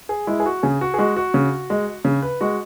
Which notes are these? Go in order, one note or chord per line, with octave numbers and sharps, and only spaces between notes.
G#4
G#3 E4
G#4
F#4
C#3 G#4
F#4
G#4
G#3 F#4
F#4
C#3
G#3
C#3
B4
G#3 F#4